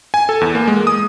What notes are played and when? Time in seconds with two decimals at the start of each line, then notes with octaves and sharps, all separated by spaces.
0.14 G#5
0.29 A4
0.41 E2
0.55 A#3
0.68 G#3
0.87 D#6